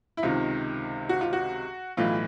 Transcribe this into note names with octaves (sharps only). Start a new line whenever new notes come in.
E4
C#2 C3 D#3 F4
F#4
F4
F#4
B1 A2 E3 F4